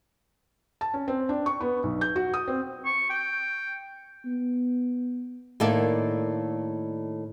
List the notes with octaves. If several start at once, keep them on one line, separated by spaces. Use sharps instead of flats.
A5
C#4
C4
D4
C#6
B3
B1
G6
F#4
D#6
C4
C#6
G5
B3
A2 D#3 A#3 A4 D5 E5